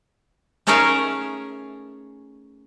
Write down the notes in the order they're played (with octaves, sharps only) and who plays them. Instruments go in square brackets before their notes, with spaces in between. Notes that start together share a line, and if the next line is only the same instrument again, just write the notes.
[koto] A3 C#4 D#4 G#4 A#4 E5